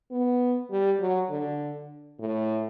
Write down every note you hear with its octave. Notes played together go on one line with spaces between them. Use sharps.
B3
G3
F#3
D3
A2